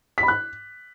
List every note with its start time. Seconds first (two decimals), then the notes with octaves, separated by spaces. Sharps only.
0.18 B6
0.23 B5
0.28 F#6